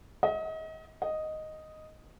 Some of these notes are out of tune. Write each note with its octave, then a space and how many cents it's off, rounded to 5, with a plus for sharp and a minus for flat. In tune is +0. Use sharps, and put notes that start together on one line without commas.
D#5 +35
D#5 +0